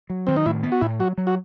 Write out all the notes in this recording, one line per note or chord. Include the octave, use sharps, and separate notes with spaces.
F#3
D#3 C4
D#4
A2 E4
B3
F#4
A2 E4
F#3 F#4
F#3
F#4